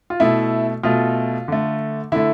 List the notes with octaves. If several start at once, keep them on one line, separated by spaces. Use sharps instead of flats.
F4
B2 A3 E4
B2 A3 F4
D3 A3
D3 A3 E4